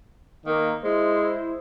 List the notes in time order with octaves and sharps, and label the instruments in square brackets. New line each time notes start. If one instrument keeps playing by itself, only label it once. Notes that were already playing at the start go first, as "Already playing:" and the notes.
[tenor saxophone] D#3 [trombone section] A#3
[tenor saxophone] G#3 [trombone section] E4 C5